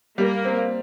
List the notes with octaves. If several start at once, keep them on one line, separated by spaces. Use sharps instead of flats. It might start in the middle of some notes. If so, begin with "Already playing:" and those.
G3 A#3
C4